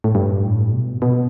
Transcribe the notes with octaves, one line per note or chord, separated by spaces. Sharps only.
A2
G2
A2
B2
B2